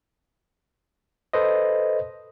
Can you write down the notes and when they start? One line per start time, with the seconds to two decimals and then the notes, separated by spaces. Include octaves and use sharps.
1.33 A4 B4 C5 D#5